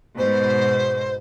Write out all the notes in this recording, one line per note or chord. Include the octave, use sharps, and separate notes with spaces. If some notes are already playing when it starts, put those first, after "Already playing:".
G#2 B2 C5